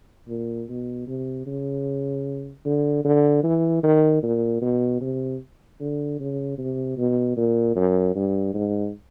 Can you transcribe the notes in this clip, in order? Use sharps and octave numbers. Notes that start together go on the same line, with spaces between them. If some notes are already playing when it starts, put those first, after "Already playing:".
A#2
B2
C3
C#3
D3
D3
E3
D#3
A#2
B2
C3
D3
C#3
C3
B2
A#2
F#2
G2
G#2